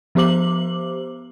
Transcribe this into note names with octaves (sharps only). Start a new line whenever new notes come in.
F3 B3 G4 C5 D6 F#7